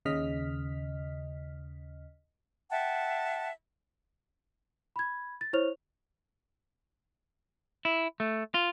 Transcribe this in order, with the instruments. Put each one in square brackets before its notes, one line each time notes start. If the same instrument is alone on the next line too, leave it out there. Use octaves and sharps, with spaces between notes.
[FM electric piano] D#2 C#3 D#5 F6 B6
[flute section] E5 F#5 G5 A5
[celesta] B5 G#6
A6
E4 C5 C#5 C#6 F6 F7
[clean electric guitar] E4
A3
F4